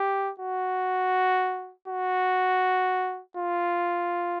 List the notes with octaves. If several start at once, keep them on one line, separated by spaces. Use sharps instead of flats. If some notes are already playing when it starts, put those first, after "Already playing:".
Already playing: G4
F#4
F#4
F4